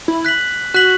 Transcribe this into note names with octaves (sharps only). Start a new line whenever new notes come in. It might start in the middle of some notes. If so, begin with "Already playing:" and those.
E4
F#6 B6 F#7
F#4 F#6 B6 F#7